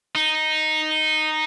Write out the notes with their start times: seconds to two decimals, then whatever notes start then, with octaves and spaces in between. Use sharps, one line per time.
0.15 D#4